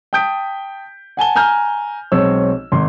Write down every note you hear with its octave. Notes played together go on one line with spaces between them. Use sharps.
G5 A5 D#6 G6 B6 D7
F#5 G#5 A5 G7
G#5 A#5 F6 G6
B1 G#3 C4 C#5 E6
G#1 C6